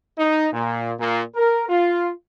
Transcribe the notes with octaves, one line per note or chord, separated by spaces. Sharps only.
D#4
A#2
A#2
A#4
F4